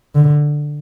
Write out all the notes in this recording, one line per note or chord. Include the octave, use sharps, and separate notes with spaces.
D3